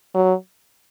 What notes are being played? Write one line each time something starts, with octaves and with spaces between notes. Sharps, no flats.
F#3